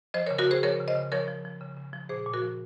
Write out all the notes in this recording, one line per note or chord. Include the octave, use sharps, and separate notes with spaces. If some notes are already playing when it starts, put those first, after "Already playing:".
F3 C5 D#5
A#4 C#5
C#3
F#4 A#4
C#3 G#4 C5
F3 A#4 C#5
C#3
C5 D#5
C#3
F3 A#4 C#5
F3
F3
C#3
C#3
F3
A#2 G#4 C5
A#2
F#4 A#4
F3